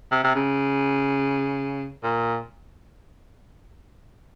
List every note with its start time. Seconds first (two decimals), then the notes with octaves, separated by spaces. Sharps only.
0.11 C3
0.24 C3
0.35 C#3
2.03 A#2